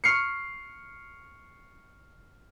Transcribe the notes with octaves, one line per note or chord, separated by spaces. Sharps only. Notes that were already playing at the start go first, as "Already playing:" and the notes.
C#6 F6 C7 C#7